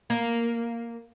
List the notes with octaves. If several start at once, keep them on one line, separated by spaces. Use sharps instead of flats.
A#3